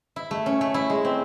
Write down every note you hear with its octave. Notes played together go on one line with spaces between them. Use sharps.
E4
A3
C#4
A3
E4
G#3
C4